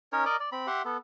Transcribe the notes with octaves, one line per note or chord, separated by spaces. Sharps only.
C#4 D#4 A#4 C#5
A#4 D5 D#5 D6
D5
C4 B5
G4 E5 F#5 C6
B3 A4